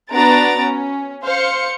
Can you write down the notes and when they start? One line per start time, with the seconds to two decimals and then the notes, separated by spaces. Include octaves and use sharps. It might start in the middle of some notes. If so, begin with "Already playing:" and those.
0.12 B3 D4 F#4 A#5 A6 D7
0.60 C#4
1.24 C5 F5 C#7